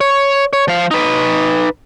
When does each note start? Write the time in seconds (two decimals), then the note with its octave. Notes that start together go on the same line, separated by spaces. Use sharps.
0.01 C#5
0.53 C#5
0.68 F3 F5
0.91 D#4 B4